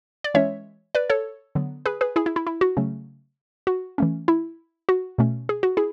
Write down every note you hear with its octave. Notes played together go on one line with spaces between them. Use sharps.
D5
E3 G#3 C#4 C#5 E5
B4 D5
A4 C#5
D3 F#3 B3
G#4 B4
G#4 B4
E4 G#4
E4
E4
E4
F#4
C#3 F#3 A3 C#4
F#4
E3 A3 C#4
E4
F#4
B2 A3 C#4
G#4
F#4
E4 G#4